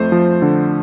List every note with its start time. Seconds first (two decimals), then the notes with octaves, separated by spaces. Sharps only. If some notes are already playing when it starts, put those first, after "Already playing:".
Already playing: F2 A3 C5
0.12 F3
0.42 D3